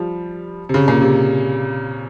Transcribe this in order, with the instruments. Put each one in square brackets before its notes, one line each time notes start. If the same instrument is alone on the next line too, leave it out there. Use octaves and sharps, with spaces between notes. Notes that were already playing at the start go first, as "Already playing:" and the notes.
Already playing: [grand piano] F3 G3
C3
C#3
A#2
C3